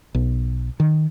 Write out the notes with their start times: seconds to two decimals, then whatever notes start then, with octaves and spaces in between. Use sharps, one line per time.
0.15 B1
0.80 D#3